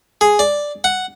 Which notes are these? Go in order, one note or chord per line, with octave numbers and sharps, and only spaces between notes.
G#4
D5
F#5